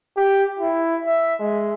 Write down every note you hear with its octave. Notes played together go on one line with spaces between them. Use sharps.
G4
E4
E5
G#3